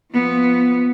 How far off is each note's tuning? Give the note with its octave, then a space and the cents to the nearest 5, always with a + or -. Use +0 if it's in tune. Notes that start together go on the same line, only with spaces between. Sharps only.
F3 +0 B3 +0